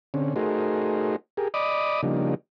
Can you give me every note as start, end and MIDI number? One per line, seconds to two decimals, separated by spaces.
0.14 0.34 50
0.14 0.34 60
0.14 0.34 61
0.36 1.16 57
0.36 1.16 63
0.36 1.16 66
0.36 1.16 68
0.36 1.16 70
0.36 1.16 72
1.37 1.48 67
1.37 1.48 68
1.37 1.48 70
1.54 2.01 74
1.54 2.01 75
1.54 2.01 83
1.54 2.01 86
1.54 2.01 87
2.03 2.35 49
2.03 2.35 53
2.03 2.35 55
2.03 2.35 58
2.03 2.35 62
2.03 2.35 63